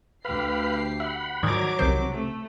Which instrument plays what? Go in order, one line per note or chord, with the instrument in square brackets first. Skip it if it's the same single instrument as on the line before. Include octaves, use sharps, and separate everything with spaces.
[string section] D2 G4 C7 [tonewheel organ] B4 F5 B5
[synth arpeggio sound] E5 [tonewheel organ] F#5 B5
[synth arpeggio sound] G#2 D#3 [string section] F3 F#3 D6 [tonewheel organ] D5 A#5 G#6
[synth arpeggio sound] C2 D#3 C5 [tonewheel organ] C3
[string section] A3